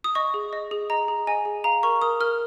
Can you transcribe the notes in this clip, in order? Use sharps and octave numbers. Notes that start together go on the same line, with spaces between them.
D#6
D#5 C#6
G#4
D#5
G#4
D#5 A#5
G#4
D#5 G#5
G#4
F5 A#5
A#4 C#6
A#4 D#6
A#4 F6